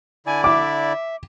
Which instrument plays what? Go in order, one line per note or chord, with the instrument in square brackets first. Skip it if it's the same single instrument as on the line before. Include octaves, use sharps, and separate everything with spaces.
[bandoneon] D3 E4 D5 [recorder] G#5
[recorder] E5 [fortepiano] D6